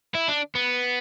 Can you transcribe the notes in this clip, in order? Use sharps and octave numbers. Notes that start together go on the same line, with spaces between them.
E4
D4
B3